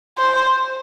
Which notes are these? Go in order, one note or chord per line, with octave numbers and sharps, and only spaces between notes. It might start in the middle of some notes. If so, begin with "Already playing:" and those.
C5